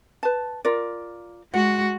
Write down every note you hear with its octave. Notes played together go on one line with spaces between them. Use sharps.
B4 A5
F4 A#4 D5
G#3 F#4 F#5